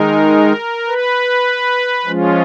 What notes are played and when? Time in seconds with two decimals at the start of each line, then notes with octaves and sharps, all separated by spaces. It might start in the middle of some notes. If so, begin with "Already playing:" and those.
Already playing: D#3 G#3 D#4 A#4
0.88 B4
2.05 F3 G#3 C#4 F4